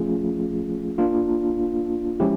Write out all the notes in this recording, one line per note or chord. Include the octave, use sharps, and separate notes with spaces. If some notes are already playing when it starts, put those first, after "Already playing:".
Already playing: F3 A3 C#4 F4 G#4
A#3 D4 F4
F3 G#3 C#4 E4 G4